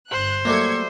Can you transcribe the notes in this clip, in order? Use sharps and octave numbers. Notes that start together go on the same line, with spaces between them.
G1 C5 F#6
F#3 G3 A3 A#3 E5 G#6 C#7